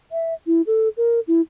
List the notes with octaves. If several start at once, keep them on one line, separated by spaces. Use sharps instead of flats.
E5
E4
A4
A#4
E4